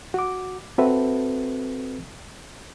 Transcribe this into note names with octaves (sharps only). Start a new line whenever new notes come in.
F#4 D6
C4 F#4 A4 B4 E5